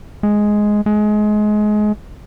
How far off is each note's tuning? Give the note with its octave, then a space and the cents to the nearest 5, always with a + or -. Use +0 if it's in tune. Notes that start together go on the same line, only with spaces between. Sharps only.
G#3 +5
G#3 +25